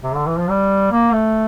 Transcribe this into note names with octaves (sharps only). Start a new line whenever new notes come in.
C3
D3
E3
F3
G3
A#3
A3